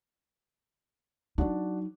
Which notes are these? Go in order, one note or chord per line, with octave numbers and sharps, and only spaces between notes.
F#3 D4 D#4 F#4 D5